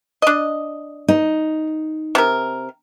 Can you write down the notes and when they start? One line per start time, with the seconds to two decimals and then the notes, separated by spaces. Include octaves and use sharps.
0.22 D4 D#5
1.08 D#4
2.15 C3 A#4